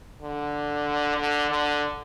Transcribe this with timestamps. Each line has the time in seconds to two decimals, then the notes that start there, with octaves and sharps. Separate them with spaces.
0.22 D3
1.18 D3
1.50 D3